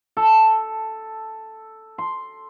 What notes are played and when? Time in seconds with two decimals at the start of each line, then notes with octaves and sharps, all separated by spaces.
0.17 A4
1.98 C6